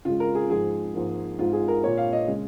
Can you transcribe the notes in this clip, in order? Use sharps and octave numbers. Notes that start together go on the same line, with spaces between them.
C#3 G#3 F4
A#4
G#4
G#2 F3 G#3 G#4
G#2 F3 A#3
G#2 G#3 F4
G#4
A#4
A#2 A#3 C#5
F5
D#5
C#3 G#3